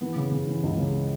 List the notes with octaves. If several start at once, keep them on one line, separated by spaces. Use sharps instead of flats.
E3 B3
C#3
C#3
E3
C#2
C#3